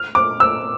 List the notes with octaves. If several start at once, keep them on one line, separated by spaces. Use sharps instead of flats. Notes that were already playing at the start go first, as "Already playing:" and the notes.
Already playing: F6
D6
E6